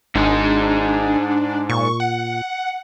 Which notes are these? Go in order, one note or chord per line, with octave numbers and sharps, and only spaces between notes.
G#1 G#2 G#3 D4 D#4
A#2 C#6
F#5